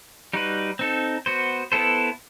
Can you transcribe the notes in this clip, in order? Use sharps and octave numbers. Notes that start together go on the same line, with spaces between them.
G3 D#4 F#4 B4
C4 D#4 A4
B3 F#4 C5
B3 E4 A4 C5